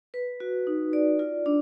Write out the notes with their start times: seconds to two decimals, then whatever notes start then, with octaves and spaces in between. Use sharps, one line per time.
0.14 B4
0.40 F#4
0.67 D#4
0.93 D5
1.19 F4
1.46 D4